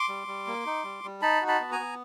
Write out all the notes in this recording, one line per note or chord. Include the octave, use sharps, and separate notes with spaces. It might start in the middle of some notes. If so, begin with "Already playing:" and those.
Already playing: C6 D6
G3
G3
A#3
D#4
G3
G3
D#4 A5 B5
F#4
A5 B5
B3
G#5 A#5
B3